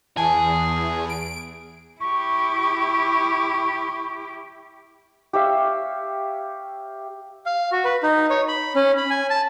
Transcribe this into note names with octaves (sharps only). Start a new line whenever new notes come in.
E2 G#4 G#5 A5
D7
E4 G4 C#6
G4 C#5 E5 F5
F5
F#4
B4
D#4
C#5
B5
C#4
B5
G#5
A5